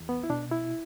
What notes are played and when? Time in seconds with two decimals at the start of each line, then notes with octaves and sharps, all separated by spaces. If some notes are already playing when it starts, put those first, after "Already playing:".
Already playing: E2
0.09 B3
0.23 E4
0.30 B2 D4
0.51 E4